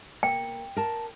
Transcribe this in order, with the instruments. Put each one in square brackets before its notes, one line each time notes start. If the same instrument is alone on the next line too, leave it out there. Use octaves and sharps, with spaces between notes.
[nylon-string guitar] A#3 [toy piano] G5
[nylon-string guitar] A#4 A5